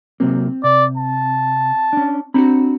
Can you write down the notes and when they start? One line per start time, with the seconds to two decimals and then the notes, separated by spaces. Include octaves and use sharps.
0.20 C3 F#3 A#3 C4
0.64 C3 D5
0.97 A5
1.93 C#4 D4
2.34 C4 D4 F#4 A#5 B5